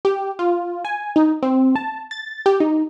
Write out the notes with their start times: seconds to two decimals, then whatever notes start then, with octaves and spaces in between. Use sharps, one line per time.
0.05 G4
0.39 F4
0.85 G#5
1.16 D#4
1.43 C4
1.76 A5
2.11 A6
2.46 G4
2.60 D#4